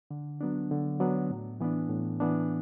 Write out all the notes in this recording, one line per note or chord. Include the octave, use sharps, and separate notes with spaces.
D3
F#3 B3 D4
D3
F#3 B3 D4
A2
E3 B3 D4
A2
E3 B3 D4